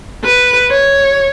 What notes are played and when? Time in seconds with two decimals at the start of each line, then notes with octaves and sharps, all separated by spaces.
0.24 B4
0.71 C#5